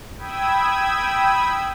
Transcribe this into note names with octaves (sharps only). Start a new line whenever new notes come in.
G5 B5 D#6 E6 G#6